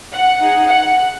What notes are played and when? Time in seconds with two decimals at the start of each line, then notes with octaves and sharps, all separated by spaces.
0.12 F#5
0.41 D#4 G#4
0.68 F#5